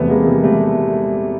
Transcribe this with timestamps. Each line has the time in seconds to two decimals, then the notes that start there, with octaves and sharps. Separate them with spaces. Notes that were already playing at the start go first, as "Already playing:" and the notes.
Already playing: E1 E2 C3 A3 B3
0.10 G#3 A#3
0.26 G3
0.44 G3 A3